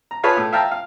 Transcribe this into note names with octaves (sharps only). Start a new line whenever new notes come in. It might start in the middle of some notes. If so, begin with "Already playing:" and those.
A#5
F4 G#4 B4 C#5 A5 B5
A2
E5 F5 G5 A5 A#5
F5